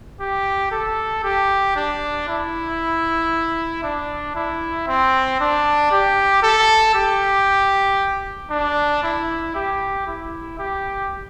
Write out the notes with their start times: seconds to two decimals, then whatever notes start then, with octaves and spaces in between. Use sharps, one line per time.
0.20 G4
0.72 A4
1.24 G4
1.76 D4
2.28 E4
3.83 D4
4.35 E4
4.88 C4
5.40 D4
5.91 G4
6.43 A4
6.95 G4
8.51 D4
9.03 E4
9.55 G4
10.07 E4
10.59 G4